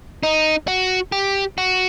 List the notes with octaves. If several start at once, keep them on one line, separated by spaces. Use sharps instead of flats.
D#4
F#4
G4
F#4